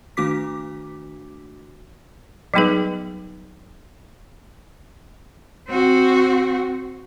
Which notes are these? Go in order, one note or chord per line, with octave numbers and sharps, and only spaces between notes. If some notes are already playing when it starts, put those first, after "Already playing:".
D#3 A3 D4 F#4 D6 B6
F#3 G3 B3 D#4 G#4 B4
C4 F#4